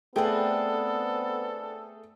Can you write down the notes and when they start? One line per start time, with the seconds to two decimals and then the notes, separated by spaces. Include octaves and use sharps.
0.16 A3 B3 C4 D4 G#4 A4 B4